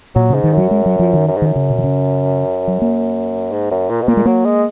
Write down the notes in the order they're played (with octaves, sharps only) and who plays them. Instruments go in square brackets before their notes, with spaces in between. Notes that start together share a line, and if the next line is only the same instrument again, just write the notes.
[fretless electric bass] A#2 [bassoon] F#3
[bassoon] G#2 [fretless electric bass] C#3
[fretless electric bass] D#3
[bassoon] F#2 [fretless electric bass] F#3
[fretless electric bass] G#3
F#3
F3
D#3
[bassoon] F#2
G#2
[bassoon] F#2 [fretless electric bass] D#3
[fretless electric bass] C#3
B2
D#3
C#3
F#3
A#3
[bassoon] G#2
F#2
A#2
B2
[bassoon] A#2 [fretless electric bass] A#3
[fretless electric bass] G#3
[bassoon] F#3 [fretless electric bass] A#3
[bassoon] G#3